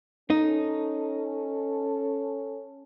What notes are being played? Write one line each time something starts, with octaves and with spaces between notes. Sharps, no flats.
C#4 D#4 A4